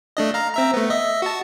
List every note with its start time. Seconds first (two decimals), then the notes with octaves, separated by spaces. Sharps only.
0.17 A3 D4 D#5
0.34 F5 A#5
0.54 C4 E5 A#5
0.74 A3 B3
0.90 D#5 E5
1.22 F#4 A5